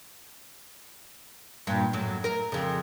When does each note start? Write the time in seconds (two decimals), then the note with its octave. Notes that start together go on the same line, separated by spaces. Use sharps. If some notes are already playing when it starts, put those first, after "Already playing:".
1.67 G2 A#2
1.93 F#2 A2 F#3
2.24 A#4
2.52 F2 C#3